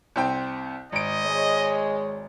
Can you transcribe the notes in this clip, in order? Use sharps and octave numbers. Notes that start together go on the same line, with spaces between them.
C2 C4 G5
G#1 D#5 D7
G#3 C#5